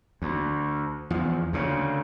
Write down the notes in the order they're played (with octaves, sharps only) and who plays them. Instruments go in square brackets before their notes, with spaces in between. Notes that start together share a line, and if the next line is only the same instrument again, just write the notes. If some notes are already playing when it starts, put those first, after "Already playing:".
[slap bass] D2
E2 F3
D2 C#3